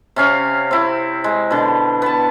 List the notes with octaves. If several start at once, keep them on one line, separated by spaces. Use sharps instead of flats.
C3 C#4 F5
C4 E4
G#3
B2 D3
B3 A5